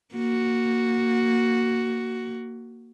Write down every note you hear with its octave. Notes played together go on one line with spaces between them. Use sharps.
A#3 F#4